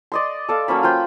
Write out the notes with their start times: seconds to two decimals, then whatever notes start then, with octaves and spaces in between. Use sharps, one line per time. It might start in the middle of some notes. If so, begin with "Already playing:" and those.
0.12 D5 D#5 C6
0.49 A4 D5 F5
0.68 F#3 A#3 C#4 B5
0.83 F4 C5 G5 B5